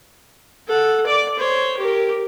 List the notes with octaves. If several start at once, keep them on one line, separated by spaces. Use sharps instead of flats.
A4 F#5
D5 D6
C5 C#5
G4 A#4